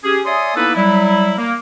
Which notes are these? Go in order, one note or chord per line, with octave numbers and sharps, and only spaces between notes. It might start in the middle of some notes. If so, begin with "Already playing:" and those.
C#4 G4 G#4
C#5 D5 E5 G#5 C6 D#6
A#3 B3 D#4 E4 A4 B4
F#3 G3 E4
A#3